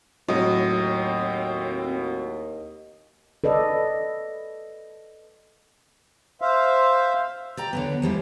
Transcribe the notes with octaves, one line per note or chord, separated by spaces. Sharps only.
D#2 A2 F#3 C4 D#5
A4 B4 D5 D#5
C5 E5 F5
D5 G5 A#5
D3 F#3 B3
F3 G3 G#3 E4